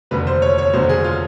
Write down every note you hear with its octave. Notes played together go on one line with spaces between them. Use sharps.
F1 D#2 D3 F#3 B4
C5
C#5
C#5
F1 D#2 D3 F#3 C5
G#4
F4